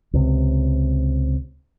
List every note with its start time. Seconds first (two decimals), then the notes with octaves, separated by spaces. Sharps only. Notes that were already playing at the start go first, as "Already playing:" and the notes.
0.13 C#2 C3